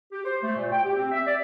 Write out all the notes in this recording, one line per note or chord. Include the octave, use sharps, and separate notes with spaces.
G4
C5
A3
A#2
G5
G4
C4
E5
D5